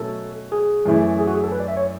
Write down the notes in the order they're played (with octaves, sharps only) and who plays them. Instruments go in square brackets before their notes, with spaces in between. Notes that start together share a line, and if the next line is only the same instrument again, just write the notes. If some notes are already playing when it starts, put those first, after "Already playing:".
Already playing: [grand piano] B2 F#3 A3 C#4 [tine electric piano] A4
[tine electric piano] G#4
[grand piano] F#2 E3 A3 E4
[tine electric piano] G#4
F#4
G#4
A4
B4
D5
E5
C#5